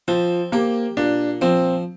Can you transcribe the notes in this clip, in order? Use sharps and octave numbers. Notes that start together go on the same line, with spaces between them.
F3 C4
A#3 G4
A#2 D4
F3 C4